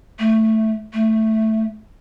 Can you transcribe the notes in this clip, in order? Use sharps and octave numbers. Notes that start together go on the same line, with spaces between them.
A3
A3